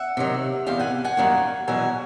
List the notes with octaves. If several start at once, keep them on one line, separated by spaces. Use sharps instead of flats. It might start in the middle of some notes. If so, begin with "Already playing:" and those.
Already playing: E5 F#5
C3 D#3 F#3
E2 C3 F5 G5
F#5 G#5
F#5 G#5
F#2 D#3 G3 A#3
E2 B2 F#3 F#5 G#5